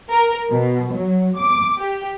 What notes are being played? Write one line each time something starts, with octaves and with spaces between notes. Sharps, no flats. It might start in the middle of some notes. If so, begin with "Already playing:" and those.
A#4
B2
F#3
D6
G4